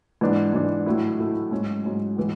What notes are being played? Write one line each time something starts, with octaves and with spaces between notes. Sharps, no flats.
G#2 E3 B3 D4
G#2 E3 B3 D4
A2 F#3 A3 E4
A2 F#3 A3 E4
G#2 F#3 C#4
G#2 F#3 C#4
A2 E3 G#3 B3